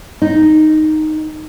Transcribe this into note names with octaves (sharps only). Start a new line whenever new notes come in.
D#4